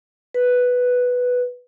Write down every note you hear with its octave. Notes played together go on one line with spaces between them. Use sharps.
B4